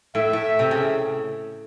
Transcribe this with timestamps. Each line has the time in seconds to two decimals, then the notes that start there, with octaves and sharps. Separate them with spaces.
0.15 A2 E5
0.33 A2
0.59 C3
0.71 C#3